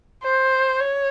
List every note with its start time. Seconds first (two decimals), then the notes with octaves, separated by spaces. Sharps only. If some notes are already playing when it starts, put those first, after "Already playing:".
0.23 C5
0.80 C#5